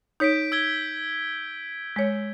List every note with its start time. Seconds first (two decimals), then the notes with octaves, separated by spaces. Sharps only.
0.20 D#4 C#5 G6 B6 D7
0.52 E6 G#6 G7
1.96 G#3 C#5